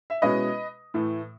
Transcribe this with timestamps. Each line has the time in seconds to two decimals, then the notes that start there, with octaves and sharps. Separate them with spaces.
0.10 E5
0.22 B2 G#3 C#4 E4 B4 D#5
0.94 A2 E3 A3